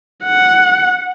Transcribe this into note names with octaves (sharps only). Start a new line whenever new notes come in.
F#5